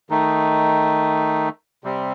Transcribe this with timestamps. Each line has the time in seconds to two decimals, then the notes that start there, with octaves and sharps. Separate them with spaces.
0.10 D#3 A3 D#4
1.84 C3 G3 C4